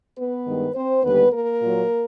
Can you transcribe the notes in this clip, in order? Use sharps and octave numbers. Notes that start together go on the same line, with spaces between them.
B3 B4
G2 D#3 G#3
C4 C5
D#2 D3 G3 B3 B4
A#3 A#4
A#2 F#3